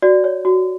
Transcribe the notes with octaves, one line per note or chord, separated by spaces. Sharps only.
F#4 D5
C#5
F#4